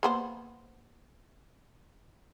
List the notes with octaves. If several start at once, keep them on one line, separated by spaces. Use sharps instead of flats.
A#3 B3 C5